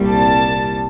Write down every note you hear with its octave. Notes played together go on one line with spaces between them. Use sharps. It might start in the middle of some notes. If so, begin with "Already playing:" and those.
Already playing: C2 A#2 G3
A5